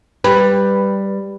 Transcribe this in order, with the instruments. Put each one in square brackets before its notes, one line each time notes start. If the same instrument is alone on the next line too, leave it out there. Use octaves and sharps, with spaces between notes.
[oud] G3 [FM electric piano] B4